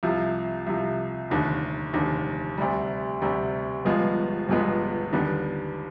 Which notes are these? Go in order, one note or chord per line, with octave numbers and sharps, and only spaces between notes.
C2 C3 F3
C2 C3 F3
F1 D#2 D3
F1 D#2 D3
D2 C3 G3
D2 C3 G3
G1 G2 F3 G#3 B3
G1 G2 F3 G#3 B3
D#2 D3 G3 B3